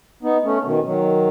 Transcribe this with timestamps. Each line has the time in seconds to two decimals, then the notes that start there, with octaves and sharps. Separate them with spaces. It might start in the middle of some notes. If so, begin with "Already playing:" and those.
0.23 B3 D#4
0.43 A3 C#4
0.65 B2 D#3
0.86 D#3 F#3